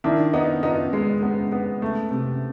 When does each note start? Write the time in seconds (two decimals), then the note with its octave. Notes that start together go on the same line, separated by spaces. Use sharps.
0.04 D#3 D4 E4
0.33 B3 D#4
0.63 B3 D#4 F4
0.93 G#3
1.22 B3
1.52 B3
1.82 A3
2.11 C3